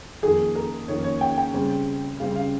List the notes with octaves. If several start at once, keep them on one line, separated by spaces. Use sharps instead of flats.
F2 D#3 A#3 G#4
A#4
F2 D#3 A#3 C#5
C#5
G5
G5
C#3 G3 C4
C#3 G3 C4 F5
F5